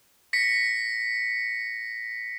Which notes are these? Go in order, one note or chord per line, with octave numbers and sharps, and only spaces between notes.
A#6 B6 C#7